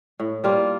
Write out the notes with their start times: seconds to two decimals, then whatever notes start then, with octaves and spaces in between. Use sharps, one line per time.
0.20 A2
0.44 G3 A#3 F4